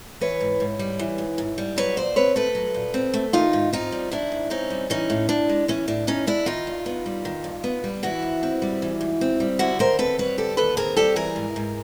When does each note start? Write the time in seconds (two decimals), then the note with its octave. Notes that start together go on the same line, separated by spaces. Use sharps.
0.21 E3 B4 C#5
0.40 G#2
0.60 G#2
0.79 G3
0.99 E3
1.18 G#2
1.38 G#2
1.58 G3
1.76 F#3 B4 C#5
1.97 A#2 C5 D5
2.16 C4 B4 C#5
2.36 A3 A4 B4
2.55 F#3
2.74 A#2
2.94 C4
3.14 A3
3.33 D#3 D#4 F4
3.53 G#2
3.73 C4 D#4 F4
3.92 G3
4.11 D#3 D4 E4
4.32 G#2
4.50 C4 C#4 D#4
4.70 G3
4.90 E3 C#4 D#4
5.10 A2
5.29 A2 D4
5.49 G#3
5.68 E3 C#4
5.87 A2 D4
6.07 A2 C#4 D#4
6.27 G#3 D4 E4
6.46 D#3 D#4 F4
6.67 G2
6.86 B3
7.06 G3
7.25 D#3
7.44 G2
7.64 B3
7.84 G3
8.03 E3 E4 F#4
8.22 G#2
8.43 C4
8.62 G3
8.82 E3
9.01 G#2
9.21 C4
9.40 G3
9.59 D3 E4 F#4
9.79 D#2 A#4 C5
9.99 C4 A4 B4
10.18 G3 B4 C#5
10.37 D3 G4 A4
10.57 D#2 A4 B4
10.77 C4 G#4 A#4
10.97 G3 G4 A4
11.16 E3 G#4 A#4
11.36 G#2
11.56 G#2